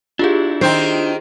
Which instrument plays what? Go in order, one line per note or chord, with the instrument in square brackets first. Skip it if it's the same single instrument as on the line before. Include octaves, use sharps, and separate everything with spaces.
[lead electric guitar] D4 E4 [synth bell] F4 G4 G#4
[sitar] D#3 C4 D#4 [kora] C5